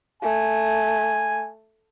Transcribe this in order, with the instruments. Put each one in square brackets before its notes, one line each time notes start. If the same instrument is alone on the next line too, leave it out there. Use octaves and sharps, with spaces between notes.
[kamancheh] A3 [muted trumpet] G#5